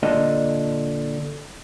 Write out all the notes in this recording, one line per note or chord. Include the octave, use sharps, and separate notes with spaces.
A#2 D3 D#5